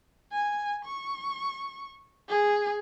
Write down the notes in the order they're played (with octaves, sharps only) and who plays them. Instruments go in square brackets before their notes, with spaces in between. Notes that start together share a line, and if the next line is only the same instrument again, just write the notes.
[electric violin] G#5
C#6
G#4